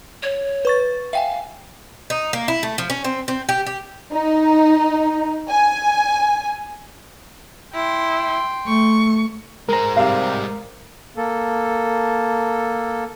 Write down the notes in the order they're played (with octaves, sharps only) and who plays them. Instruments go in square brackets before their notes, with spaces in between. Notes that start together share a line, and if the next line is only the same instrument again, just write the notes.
[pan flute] C#5
[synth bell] B4 C#6 A6
[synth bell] E5 G5 G#5 [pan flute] F5
[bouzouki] D#4
A#3
E4
A3
F3
C#4
C4
C4
G4
G4
[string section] D#4
G#5
[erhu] E4 [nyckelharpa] G5 C6
[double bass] A3 [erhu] C#6
[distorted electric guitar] G#3 C5 [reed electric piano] A#4 A#5
[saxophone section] C3 G3 [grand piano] F5
[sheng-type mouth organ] A#3 A4